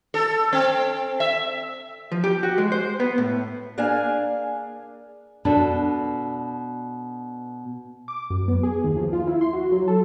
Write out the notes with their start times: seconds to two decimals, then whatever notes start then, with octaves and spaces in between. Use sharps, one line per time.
0.14 A4
0.53 C4
1.20 E5
2.12 F3
2.24 G4
2.43 F#4
2.58 G#3
2.72 C5
3.00 B3
3.18 A2
3.77 A#3 D4 G#4 F5 G#5
5.45 B2 D4 A4
8.08 D6
8.30 F#2
8.48 B3
8.63 G#4
8.84 D#2
8.97 F3
9.13 F4
9.27 E4
9.41 C6
9.53 F#4
9.72 F#3
9.88 A4